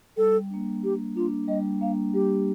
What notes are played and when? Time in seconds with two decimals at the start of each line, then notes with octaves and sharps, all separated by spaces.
0.17 G3 A4
0.50 A#3 D4
0.83 G3 G4
1.16 A#3 D4 F4
1.48 G3 D#5
1.81 A#3 D4 F5
2.14 G3 G4